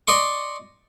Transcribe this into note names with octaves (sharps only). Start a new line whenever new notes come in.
D5 D#5 C6 C#6